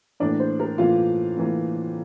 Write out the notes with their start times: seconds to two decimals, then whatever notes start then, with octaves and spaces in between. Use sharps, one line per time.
0.20 A2 E3 A#3 D4 D5
0.40 C5
0.60 A#4
0.78 A2 E3 A#3 F4 F5
1.37 A2 E3 A#3